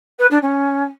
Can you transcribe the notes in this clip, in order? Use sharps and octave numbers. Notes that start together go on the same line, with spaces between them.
B4
D4
C#4